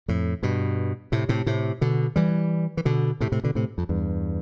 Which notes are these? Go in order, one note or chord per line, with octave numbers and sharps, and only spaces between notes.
F2 A2
G2 B2
A2 C3
A2 C3
A2 C3
B2 D3
E3 G3
E3
B2 D3
A2 C3
A2 C3
B2 D3
A2 C3
F2
E2 G2